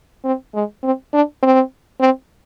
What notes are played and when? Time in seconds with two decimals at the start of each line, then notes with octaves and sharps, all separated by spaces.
0.24 C4
0.54 G#3
0.83 C4
1.13 D4
1.43 C4
2.00 C4